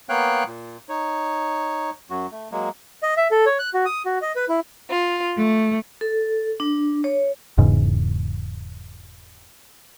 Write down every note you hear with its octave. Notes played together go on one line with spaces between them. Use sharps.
A#3 B3 C#5 F5 G5 F#6
A#2
D#4 C#5
F#2 F#3 F#4
A3
F#3 G#3 A#3
D#5
E5
A4
C#5
F#6
F#4
D#6
F#4
D#5
B4
E4
F4
A3
A4
D4
C#5
E1 E2 G#2 C#3